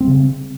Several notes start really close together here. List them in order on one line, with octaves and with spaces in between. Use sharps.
C4 G3 C#3